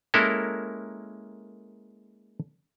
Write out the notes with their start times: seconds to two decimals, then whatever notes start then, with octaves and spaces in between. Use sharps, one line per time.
0.14 G#3 A#3 C#4 E4 A4 A#4